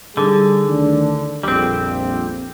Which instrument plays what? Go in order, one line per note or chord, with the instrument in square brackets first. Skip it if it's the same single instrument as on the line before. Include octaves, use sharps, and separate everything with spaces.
[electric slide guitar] D3 [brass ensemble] G3 D#4 G#4
[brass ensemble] D2 D#3 D4
[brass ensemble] A#1 F2 [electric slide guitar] G3 C4